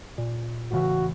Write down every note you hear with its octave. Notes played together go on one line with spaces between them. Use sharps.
A#2
A1 C#3 E3 F#4